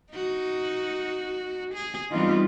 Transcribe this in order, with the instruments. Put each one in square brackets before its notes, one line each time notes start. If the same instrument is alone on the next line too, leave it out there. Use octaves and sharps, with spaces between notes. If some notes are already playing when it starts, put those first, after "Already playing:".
[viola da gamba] D#4 F#4
G#4
[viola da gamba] E3 B3 C4 [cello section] G3 D#4 F4